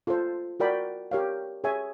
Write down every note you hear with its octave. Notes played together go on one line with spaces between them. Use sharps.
F4 A4 C5
F#4 A#4 D5 G5 B5
G4 A#4 C#5 F5
G#4 C#5 E5 G#5